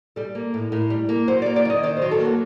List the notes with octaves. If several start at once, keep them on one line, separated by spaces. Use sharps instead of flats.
G3 A4
A#3
A2
A2 A#4
G3
A#3
F#3 C5
A#3 D5
D5
D#3 D#5
D#3 D5
C5
F#3
A4
A#3
F#4